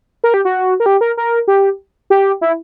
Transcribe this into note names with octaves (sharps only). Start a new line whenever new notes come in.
A#4
G4
F#4
A#4
G4
A#4
A#4
G4
G4
E4